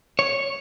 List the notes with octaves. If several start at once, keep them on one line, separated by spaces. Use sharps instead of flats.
C#5